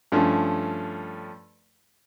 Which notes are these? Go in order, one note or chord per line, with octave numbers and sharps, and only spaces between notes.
G2 F3 A3 C#4